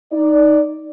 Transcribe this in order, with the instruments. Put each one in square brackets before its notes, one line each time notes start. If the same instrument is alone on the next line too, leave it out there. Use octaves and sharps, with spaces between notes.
[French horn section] D#4 D5